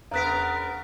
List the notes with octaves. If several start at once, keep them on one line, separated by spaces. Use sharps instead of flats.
E2 C#3 B3 A#4 A#5 F#6 B6